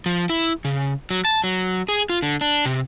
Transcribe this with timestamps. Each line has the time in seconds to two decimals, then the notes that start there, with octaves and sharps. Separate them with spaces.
0.06 F3
0.30 E4
0.65 C#3
1.10 F#3
1.25 A5
1.44 F#3
1.89 G#4
2.09 F4
2.22 D3
2.41 D4
2.65 C3